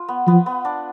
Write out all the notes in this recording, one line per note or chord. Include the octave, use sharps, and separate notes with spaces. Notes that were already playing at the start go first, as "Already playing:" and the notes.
Already playing: F4 B4
B3
F3 B3
B3
D4